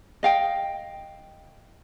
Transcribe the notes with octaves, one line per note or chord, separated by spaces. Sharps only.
D#5 F5 G5